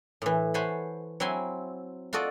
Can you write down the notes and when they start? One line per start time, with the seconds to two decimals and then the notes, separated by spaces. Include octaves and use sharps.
0.22 A2 E3
0.54 C5 C#5 F#5 G#5 A5 B5
1.20 F#3 C4 E4 E5 G#5 C6
2.13 F4 F#4 A4 D5 D#5